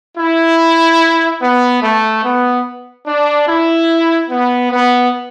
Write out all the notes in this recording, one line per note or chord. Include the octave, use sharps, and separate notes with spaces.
E4
B3
A3
B3
D4
E4
B3
B3